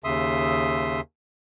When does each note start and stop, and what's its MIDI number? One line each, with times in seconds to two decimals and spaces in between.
0.04 1.01 39
0.04 1.01 49
0.04 1.01 76
0.04 1.01 84
0.04 1.01 87